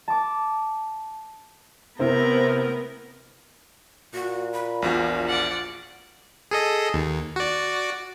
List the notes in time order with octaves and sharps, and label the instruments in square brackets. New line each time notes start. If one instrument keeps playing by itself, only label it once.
[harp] A5 D6
[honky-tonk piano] C3 C4 E4 [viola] B3 A#4
[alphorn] A#2 [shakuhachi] F#4
[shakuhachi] B5
[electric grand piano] A#1 E2 F#4 [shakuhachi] F4
[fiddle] D5 F#5
[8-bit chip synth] G#4 A4 D#5
D#2
F#4 D5